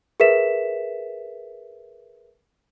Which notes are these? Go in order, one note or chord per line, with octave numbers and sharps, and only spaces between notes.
G#4 A#4 B4 E5 B6 E7